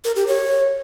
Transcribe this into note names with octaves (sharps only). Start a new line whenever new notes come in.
A#4
G4
C#5